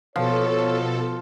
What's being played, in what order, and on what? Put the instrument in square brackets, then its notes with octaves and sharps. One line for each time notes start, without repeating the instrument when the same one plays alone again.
[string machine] B2 A4 [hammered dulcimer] F3 [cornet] C#5